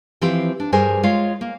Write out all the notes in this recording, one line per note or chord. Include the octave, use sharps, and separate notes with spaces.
E3 F3 C4 E4 G4
D4
G2 G3 G#4 A#4 C5 G#5
G#3 F4 C#5 F5
A#3